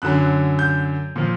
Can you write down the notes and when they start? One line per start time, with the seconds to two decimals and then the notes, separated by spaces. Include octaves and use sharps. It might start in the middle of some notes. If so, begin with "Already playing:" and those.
0.02 F#2 D3 F#3 F#6
0.59 G6
1.16 A#2 F3